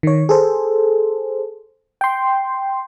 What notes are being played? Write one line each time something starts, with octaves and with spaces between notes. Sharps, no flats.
D#3 C#5
G#4 A4 C5
G5 C6